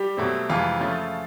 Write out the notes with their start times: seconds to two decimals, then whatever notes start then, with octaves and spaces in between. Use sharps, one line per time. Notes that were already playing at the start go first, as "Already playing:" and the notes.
Already playing: G3 G4
0.17 B2 F#3 A3 C4
0.50 F2 C3 E3 G#3 F4
0.80 C#3 F3 A3 C#4